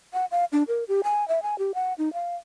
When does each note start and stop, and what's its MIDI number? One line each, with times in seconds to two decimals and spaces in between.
0.13 0.25 78
0.31 0.45 77
0.52 0.63 62
0.68 0.84 70
0.88 1.01 67
1.04 1.27 80
1.28 1.42 76
1.43 1.58 80
1.59 1.72 67
1.75 1.93 78
1.98 2.12 63
2.13 2.36 77